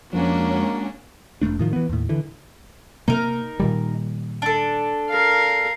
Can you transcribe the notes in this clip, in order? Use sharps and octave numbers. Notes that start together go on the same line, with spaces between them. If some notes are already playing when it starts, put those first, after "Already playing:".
F2 F3 G#3 A#3 C#4 D4 F#4
F1 A2 A3 D4
A2 D#3 F3
E3 B3
D#2 A2
D3 E3
C3 A#3 D#4 A#4
A#2 D#3 G3
D4 A4
A#4 F5